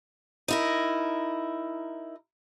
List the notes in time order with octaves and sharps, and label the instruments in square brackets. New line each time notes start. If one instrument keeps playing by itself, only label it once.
[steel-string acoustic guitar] D#4 E4 A#4